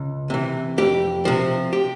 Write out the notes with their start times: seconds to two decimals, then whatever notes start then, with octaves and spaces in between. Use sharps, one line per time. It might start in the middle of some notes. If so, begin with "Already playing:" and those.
Already playing: C#2
0.30 C3 E3
0.78 F2 G4
1.25 C3 F3
1.73 G4